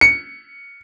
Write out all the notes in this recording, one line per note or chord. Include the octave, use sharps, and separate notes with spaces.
C#7